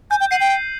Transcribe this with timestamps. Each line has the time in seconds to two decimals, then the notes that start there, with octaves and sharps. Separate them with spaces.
0.11 G#5 G6
0.20 G5
0.31 F#5 C7 D#7 F#7
0.40 G5
0.49 G6